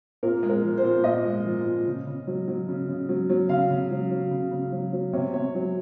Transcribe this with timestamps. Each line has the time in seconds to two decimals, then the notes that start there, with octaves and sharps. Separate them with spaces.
0.23 A#2 A#4
0.43 G#3
0.49 A#4
0.64 F3
0.78 C5
0.84 A#2
1.04 A#2 D#5
1.24 G#3
1.45 F3
1.65 A#2
1.86 C#3
2.07 C#3
2.27 F#3
2.48 F#3
2.68 C#3
2.89 C#3
3.09 F#3
3.29 F#3
3.49 C#3 F5
3.70 C#3
3.91 F#3
4.11 F#3
4.31 C#3
4.51 C#3
4.72 F#3
4.93 F#3
5.13 C3 C#5
5.33 C3 C#5
5.55 F#3